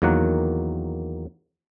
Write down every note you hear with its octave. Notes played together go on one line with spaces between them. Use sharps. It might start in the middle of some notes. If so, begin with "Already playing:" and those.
E2 D#3 F#3 A#3 F#5